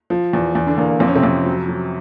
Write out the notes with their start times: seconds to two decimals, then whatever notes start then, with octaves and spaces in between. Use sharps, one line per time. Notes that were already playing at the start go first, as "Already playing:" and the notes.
0.10 F3
0.33 E2
0.55 E2
0.66 D3 D4
0.78 E2 A#3
0.89 A#3
1.00 F2 C4
1.08 C#4
1.15 C3 C4
1.23 F2
1.46 F#3
1.68 F#3